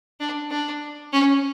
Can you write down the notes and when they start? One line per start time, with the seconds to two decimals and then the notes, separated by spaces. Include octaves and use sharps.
0.20 D4
0.51 D4
1.13 C#4